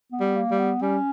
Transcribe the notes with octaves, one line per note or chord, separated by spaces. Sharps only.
B3
G3
A#3
G3
B3
G3 C#4